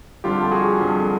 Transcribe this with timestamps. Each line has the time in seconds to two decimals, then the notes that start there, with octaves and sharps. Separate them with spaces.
0.24 F2 D3 G3 F4 G4
0.52 F#4 G#4
0.80 F2 D3 G3